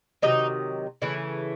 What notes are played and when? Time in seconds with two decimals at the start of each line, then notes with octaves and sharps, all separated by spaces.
0.22 C3 D#3 F#3 D#4
1.02 C#3 E3 A3 E4